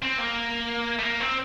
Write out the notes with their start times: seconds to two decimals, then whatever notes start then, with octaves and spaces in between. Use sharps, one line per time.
0.03 C4
0.19 A#3
0.99 A3
1.03 A#3
1.20 C4